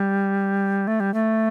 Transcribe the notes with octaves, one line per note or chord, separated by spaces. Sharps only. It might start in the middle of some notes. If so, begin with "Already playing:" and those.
Already playing: G3
A3
G3
A3